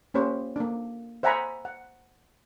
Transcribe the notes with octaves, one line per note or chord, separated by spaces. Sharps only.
A#3 C#4 G4 C5 C#5 B5
A#3 D4
C5 E5 F#5 G#5 A#5 B5
F#5